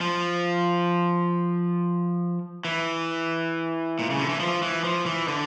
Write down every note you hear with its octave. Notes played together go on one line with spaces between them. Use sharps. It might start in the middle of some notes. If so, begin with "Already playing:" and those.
F3
E3
A#2
C#3
D3
E3
F3
E3
F3
E3
D3